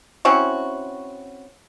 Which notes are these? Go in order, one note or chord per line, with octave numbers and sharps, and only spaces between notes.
C4 C#4 E4 F#4